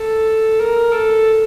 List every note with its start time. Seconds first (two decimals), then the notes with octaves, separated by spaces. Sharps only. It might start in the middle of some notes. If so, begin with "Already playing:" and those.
Already playing: A4
0.60 A#4
0.92 A4